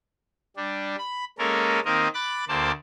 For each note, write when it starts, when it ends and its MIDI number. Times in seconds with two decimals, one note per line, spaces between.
0.56 0.96 55
0.56 0.96 62
0.98 1.25 83
1.38 1.80 56
1.38 1.80 58
1.38 1.80 61
1.38 1.80 69
1.38 1.80 70
1.85 2.08 51
1.85 2.08 58
1.85 2.08 60
1.85 2.08 70
1.85 2.08 75
2.14 2.45 83
2.14 2.45 86
2.14 2.45 90
2.14 2.45 93
2.48 2.72 38
2.48 2.72 58
2.48 2.72 72
2.48 2.72 74
2.48 2.72 81